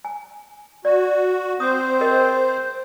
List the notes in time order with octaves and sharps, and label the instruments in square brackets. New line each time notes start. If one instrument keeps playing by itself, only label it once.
[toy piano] G#5
[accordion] F#4 [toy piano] D5
[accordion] C4 C5 [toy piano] D#6
[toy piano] G#4 A#4 D#5